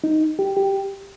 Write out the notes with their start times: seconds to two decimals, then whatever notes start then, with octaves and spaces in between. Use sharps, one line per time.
0.04 D#4
0.39 G4
0.57 G4